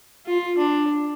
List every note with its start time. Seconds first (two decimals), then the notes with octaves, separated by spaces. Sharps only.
0.26 F4
0.58 D4